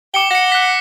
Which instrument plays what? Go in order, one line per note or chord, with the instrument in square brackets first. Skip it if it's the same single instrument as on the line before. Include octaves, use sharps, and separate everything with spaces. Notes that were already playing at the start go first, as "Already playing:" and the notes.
[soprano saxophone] G5 [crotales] D6 C#7 G7
[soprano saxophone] F#5 [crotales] A#6 C#7
[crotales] F#6 B6